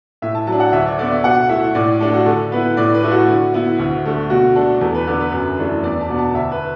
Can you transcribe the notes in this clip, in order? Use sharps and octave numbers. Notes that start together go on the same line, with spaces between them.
A2 E5
A5
F#3 A5
D4
F#5
D2 E5
D5
D3 B3 D5
E5
B2 F#5
A3 E4 E5
A2 D5
A3 D4 A4
F#4
D3 A4
B3 E4 B4
A2 D5
B4
A3 E4
F#4
D3
B3 E4
D2
D3 A3
B2 F#4
A3 D4 A4
E2 A4
B4
D3 B3 D5
B4
F#2
E3 A3 D4
E2 D5
A5
B2 B3 D4
A5
D2 E5
B4